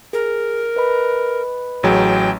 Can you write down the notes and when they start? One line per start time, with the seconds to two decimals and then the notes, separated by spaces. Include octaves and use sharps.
0.13 G#4 A#4
0.76 B4 D#5 B5
1.83 A1 F#3 G#4 G5